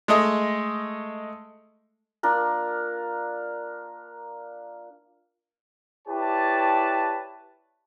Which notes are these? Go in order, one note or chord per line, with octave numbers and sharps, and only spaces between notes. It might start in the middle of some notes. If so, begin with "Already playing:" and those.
G#3 A3 D#5
A#3 D4 F4 A#4
E4 G4 B4 C#5 D5 A5